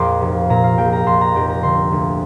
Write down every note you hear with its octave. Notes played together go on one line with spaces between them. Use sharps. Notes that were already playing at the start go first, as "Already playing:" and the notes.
Already playing: A#1 F2 A#2 G5 A#5 C6 D6
F1
A#2 A#5
F5
A#1 G5
A#5
F2 C6
A#5
F1 G5
A#5
D3 C6
D2